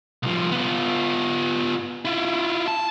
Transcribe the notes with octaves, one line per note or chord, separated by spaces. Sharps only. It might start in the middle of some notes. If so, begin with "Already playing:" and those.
C2 F3
B3 F4
E4 F4
A5